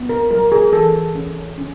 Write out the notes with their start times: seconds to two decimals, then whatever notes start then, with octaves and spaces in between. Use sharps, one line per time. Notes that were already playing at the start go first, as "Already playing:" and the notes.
Already playing: B3
0.09 A#4
0.31 F#3 A#4
0.52 G#4
0.73 E3 A4
1.15 C#4
1.57 C#4